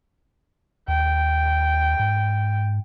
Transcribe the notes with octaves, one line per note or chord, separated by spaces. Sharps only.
D#2 G5
G#2